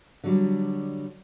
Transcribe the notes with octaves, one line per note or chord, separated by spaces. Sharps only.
D3 F#3 G3